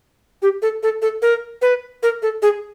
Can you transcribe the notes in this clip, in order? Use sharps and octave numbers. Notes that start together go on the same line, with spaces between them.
G4
A4
A4
A4
A#4
B4
A#4
A4
G#4